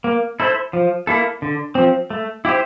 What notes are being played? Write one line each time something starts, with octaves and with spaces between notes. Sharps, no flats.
A#3
E4 A4 C5
F3
A#3 E4 A4
D3
F3 C4
A3
E4 G4 C5